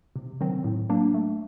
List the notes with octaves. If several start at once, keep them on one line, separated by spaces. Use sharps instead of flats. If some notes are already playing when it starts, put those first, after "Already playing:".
C3
D#3 F#3 C4
A2
F#3 A#3 D4
A3